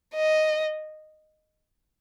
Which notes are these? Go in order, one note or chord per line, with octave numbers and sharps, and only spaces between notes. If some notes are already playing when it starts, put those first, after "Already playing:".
D#5